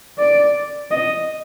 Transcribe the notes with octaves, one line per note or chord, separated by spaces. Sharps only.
D5
D#5